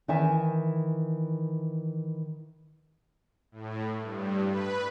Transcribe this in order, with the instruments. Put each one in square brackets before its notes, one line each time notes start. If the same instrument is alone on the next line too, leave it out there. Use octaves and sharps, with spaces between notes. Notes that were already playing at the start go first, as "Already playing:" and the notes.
[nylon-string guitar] D#3 E3 E5 G#5 A5
[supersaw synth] A2
G2
B4